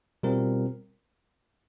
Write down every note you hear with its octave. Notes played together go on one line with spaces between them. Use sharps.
B2 G3 C4 F4 A#4